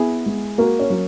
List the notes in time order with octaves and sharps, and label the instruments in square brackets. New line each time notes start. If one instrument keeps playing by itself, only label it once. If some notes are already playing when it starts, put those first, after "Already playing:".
Already playing: [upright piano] B3 E4 G#4
G#3
A#3 F#4 A#4
C#4
F#3